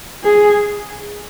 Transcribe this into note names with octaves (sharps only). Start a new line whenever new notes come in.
G#4